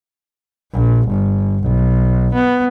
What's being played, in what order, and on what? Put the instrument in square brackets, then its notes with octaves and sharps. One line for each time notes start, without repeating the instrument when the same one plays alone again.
[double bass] A#1
G1
B1
B3